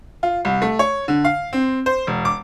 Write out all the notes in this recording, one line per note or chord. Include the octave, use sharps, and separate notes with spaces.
F4
C2
A3
C#5
D3
F5
C4
C5
E1
D6